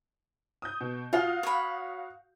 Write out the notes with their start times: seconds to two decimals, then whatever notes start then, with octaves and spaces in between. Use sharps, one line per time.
0.62 D#6 G6
0.81 B2
1.13 F4 F#4 F5 D#6
1.43 C#5 B5